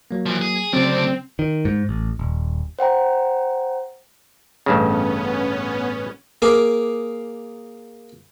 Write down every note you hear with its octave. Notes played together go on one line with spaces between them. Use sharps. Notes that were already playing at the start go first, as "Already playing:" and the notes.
F#3 A#3
E3 F3
G#4
D2 C#3 F#3 C4 D5
D#3
G#2
A1
D#1
C5 F#5 G5 A#5
A1 G2 C#3 B3 C#4
A#3 G#4 F5 D6